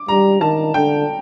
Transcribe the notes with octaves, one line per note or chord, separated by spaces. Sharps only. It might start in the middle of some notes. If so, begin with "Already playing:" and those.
Already playing: D6
G3 A#5
D#3 A5
D3 G5